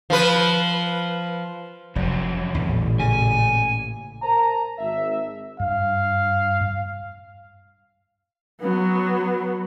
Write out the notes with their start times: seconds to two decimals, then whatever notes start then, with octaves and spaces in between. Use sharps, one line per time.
0.10 F3 B4
1.96 F1 F2 F#3
2.54 A1 E2 A#2 E3
3.00 C#3 G#5
4.23 A#4 C5 A5 A#5
4.78 G#1 E5
5.60 G2 F5
8.61 F#3 B3